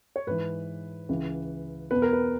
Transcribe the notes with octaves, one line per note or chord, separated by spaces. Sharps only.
C#5
G#2 E3 B4
C#2 C#3 E3
E2 B2 B4
A#4
B4